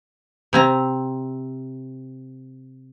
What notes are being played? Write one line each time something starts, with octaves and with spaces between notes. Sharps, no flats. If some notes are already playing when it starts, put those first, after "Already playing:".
C3 C4 A#5